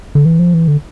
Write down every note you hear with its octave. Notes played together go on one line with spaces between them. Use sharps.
D3
E3
F3
E3
D3